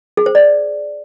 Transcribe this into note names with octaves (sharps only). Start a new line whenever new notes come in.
G#4
C5
D5